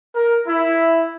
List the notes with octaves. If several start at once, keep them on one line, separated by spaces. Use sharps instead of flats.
A#4
E4